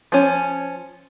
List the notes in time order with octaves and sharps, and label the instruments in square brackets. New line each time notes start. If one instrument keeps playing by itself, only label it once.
[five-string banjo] F3 C#4